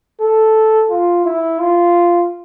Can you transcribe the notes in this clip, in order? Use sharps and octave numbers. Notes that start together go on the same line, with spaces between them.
A4
F4
E4
F4